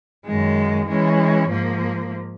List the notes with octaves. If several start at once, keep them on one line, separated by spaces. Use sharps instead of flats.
F#2 D#3 G#3
E3 G#3 C#4
G#2 F3 A#3